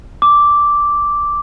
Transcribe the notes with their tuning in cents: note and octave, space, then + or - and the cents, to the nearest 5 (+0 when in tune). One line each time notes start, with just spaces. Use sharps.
D6 -5